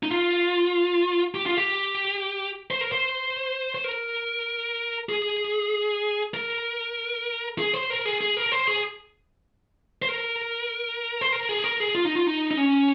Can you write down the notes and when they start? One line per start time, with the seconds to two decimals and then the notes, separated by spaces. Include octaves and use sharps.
0.03 D#4
0.11 F4
1.35 G4
1.46 F4
1.57 G4
2.71 C5
2.81 A#4
2.92 C5
3.75 C5
3.84 A#4
5.09 G#4
6.34 A#4
7.59 G#4
7.74 C5
7.90 A#4
8.05 G#4
8.21 G#4
8.37 A#4
8.52 C5
8.67 G#4
10.02 C5
10.08 A#4
11.21 C5
11.32 A#4
11.49 G#4
11.64 A#4
11.80 G#4
11.95 F4
12.05 D#4
12.15 F4
12.27 D#4
12.51 D#4
12.57 C#4